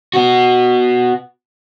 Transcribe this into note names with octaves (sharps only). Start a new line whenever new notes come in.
B3 F#4